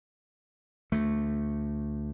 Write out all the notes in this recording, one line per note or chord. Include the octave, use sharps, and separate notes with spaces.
D2 A3